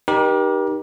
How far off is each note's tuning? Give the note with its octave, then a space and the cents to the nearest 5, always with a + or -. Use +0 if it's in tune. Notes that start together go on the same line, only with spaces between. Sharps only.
D#4 -20 G4 +0 A#4 +40